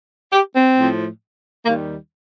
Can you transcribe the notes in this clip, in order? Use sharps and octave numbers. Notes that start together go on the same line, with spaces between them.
G4
C4
A2 F3
D#2 D#3 G3 A#3